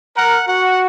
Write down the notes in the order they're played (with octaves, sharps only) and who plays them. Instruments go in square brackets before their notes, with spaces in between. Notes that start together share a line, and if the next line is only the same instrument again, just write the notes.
[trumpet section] A#4 [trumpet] F#5
[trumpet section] F#4 [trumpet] F#5